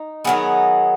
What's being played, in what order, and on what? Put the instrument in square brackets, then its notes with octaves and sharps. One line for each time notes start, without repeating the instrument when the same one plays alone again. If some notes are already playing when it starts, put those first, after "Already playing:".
Already playing: [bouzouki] D#4
D#3 F#3 B3 G#4